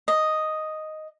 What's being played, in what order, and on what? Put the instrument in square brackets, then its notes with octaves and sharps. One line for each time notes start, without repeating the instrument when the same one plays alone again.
[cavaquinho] D#5